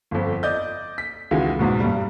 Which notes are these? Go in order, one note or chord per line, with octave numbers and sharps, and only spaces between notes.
G1 F2
D5 D#5 G6
B6
C#2 D#3 E3 G#3 F#4
E2 G#2 B2
G2 G3